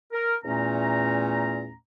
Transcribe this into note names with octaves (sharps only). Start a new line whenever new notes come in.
A#4
E2 A#2 A3 C#4 A#5